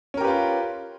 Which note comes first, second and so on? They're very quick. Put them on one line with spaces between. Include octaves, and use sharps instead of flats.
C#4 A#4 G4 B4 F4